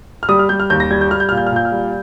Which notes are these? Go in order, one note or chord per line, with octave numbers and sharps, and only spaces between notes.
F6
G3 D#6
F6
G3 G6
F6
D#2 G6
A#6
G3 G#6
G6
G3 F6
G6
A#2 F6
G6
F6
A#2 G6
F6
G3